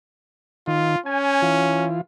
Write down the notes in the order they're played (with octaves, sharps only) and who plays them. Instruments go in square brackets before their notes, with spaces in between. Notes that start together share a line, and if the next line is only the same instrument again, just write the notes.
[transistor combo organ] D#3 [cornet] F4
[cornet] C#4 [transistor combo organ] G#5
[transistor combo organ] E3 F4